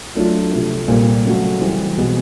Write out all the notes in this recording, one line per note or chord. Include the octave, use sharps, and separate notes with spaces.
F#3 A3 D4 F4
C3 F3 A3
A#2 G3 C4
C#3 F#3 A3 C#4 F#4
E3 G3 C4
B2 G#3 B3